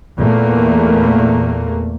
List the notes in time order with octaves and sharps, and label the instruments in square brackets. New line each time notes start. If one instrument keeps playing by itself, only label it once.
[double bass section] E2 A#2 A3 A#3